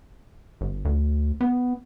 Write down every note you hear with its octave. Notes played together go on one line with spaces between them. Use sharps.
G1
D2
B3